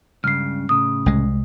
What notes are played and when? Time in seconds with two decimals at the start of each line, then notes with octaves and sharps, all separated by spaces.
0.24 C#2 G2 C#3 F6 C7
0.69 A2 C#3 D#6
1.06 C2 G#3